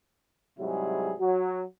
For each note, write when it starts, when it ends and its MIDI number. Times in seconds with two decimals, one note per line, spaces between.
0.59 1.14 44
0.59 1.14 48
0.59 1.14 54
0.59 1.14 55
0.59 1.14 64
0.59 1.14 68
1.20 1.62 54